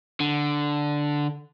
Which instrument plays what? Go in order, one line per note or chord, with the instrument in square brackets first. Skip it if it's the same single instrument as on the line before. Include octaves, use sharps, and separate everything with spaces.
[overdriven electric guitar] D3